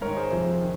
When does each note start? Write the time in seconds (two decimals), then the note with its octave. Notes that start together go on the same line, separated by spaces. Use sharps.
0.01 G#2 D#3 A#4 C#5
0.17 G#4 C5
0.31 F2 C3 F3
0.61 D#3